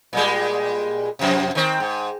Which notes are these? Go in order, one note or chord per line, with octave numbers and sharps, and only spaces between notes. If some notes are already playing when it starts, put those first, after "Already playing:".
A#2 G3 G#3
F2 C3
D#3 C4
G#2